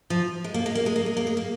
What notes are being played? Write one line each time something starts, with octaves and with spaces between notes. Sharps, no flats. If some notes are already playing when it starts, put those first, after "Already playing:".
F3
G#3
A#3
G#3
A#3
G#3
A#3
G#3
A#3
G#3
A#3